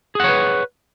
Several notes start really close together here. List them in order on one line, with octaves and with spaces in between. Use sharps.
G#4 F#5 C#5 B4